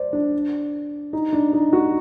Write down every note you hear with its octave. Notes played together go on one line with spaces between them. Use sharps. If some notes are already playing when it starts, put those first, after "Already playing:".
Already playing: C5 D5
D4
D#4
D4
D#4
F#4